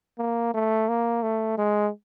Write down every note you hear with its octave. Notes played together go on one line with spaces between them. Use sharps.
A#3
A3
A#3
A3
G#3